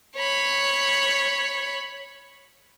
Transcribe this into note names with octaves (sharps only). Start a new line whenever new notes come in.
C#5 B5